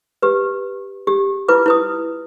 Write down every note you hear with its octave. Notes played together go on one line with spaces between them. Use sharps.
G4 B4
G4
E4 F4 B4 D6
E4 B4 D#6